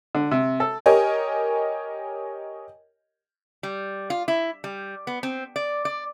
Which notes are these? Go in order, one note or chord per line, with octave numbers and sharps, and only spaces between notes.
D3
C3
A4
G4 A#4 C#5 D#5 G#5
G3
F4
E4
G3
B3
C4
D5
D5